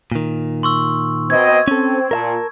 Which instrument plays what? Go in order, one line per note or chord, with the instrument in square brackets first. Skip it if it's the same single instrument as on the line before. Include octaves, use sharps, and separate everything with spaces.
[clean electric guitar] A#2 D#3
[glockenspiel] C6 C#6 E6
[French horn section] B2 C4 D#5 [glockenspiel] G#6
[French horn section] C4 [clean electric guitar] C#4 A4
[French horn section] A#2 [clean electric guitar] A#4 E5 A5